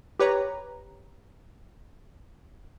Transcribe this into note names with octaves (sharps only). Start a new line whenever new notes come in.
G4 B4 C#5 A#5